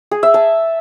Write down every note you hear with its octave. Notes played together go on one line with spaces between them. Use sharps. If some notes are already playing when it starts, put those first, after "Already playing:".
G#4
E5
A5